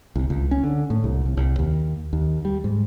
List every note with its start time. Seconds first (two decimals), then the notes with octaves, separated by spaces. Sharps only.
0.16 C2
0.30 C#2
0.51 C#4
0.64 D3
0.90 A2
1.04 C2
1.25 C2
1.37 C2
1.59 D#2
2.13 D#2
2.45 G3
2.64 G#2